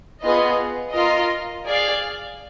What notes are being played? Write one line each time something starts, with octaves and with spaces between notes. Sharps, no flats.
B3 F4 G#4 B4 D#5
F4 A#4 D#5
G#4 D5 F5